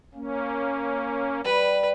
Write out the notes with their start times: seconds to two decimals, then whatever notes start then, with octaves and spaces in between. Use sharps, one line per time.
0.14 A#3 C#4
1.44 G3 B4